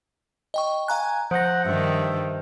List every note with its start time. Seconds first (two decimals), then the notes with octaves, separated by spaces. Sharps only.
0.54 D#5 G5 C#6
0.88 F5 G#5 A#5 F#6
1.31 F3 C5 F#5 G6 A#6
1.65 G2 D#3 E5